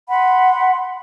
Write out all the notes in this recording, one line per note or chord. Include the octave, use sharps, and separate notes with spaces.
F#5 B5 C6